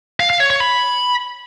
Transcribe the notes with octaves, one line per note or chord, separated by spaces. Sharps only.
F5
F5
C#5
C#5
B5